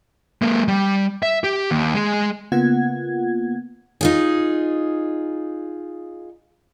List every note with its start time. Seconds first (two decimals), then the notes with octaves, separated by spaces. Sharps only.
0.42 G#3 A#3
0.68 G3
1.23 E5
1.44 G4
1.71 D#2
1.94 G#3 G#4
2.52 C#3 A#3 B3 F4 F#5 G#6
4.01 D#4 F4 G#4